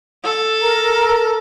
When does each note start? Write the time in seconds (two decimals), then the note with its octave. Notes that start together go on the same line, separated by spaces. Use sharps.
0.24 A4
0.62 A#4 A#5